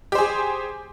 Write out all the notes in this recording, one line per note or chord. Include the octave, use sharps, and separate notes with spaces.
G4 G#4 C5